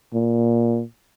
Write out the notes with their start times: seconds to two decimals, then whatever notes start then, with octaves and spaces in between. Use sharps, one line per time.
0.14 A#2